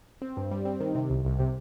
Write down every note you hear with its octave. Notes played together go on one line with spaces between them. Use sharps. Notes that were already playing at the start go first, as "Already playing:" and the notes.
C4
G2
G3
C4
D#3
C3
C2
C2
C3